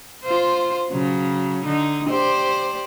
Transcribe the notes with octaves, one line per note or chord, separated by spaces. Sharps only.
F4 C5
C#3 F#3
D3 D#4
G4 C5 D5